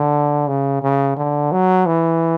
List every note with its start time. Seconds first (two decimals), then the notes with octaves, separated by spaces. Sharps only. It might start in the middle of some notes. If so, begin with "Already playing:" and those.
Already playing: D3
0.48 C#3
0.83 C#3
1.17 D3
1.52 F#3
1.87 E3